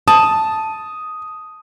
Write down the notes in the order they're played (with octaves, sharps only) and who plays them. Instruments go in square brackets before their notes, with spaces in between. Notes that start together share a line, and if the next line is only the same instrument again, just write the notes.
[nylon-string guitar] A5 [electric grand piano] D#6